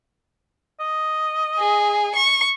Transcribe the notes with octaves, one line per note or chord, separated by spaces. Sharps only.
D#5
G#4
C#6